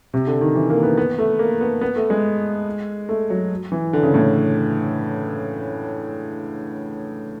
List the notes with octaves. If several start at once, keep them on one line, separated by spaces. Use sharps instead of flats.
C3
D3
D#3
E3
A#3
B3
B3
A3
A#3
B3
B3
A3
G#3
A3
F#3
E3
D3
C#3
A2